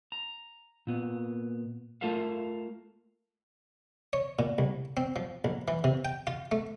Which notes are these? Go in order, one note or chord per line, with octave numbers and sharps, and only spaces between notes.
A#5
A#2 B3
A3 F4 A4 A#4 E5 F5
C#5
A#2
C2
C4
F3
A#1
E3
C3
G5
F4
A3